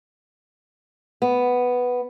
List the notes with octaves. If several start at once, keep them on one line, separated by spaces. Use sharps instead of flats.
B3